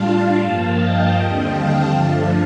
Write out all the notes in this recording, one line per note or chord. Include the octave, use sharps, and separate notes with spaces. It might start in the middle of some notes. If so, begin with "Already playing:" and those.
Already playing: A2 G3 D4 F4 F5 A5
G2 F3 A#3
D#5 G5
D#2 D3 G3 C4 D#5 G5
F5 A5
G2 D3 F3 A3